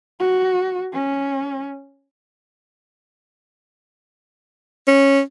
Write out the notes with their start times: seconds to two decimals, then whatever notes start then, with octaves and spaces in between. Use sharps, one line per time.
0.20 F#4
0.94 C#4
4.87 C#4